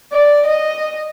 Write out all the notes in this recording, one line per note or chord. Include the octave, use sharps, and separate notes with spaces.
D5
D#5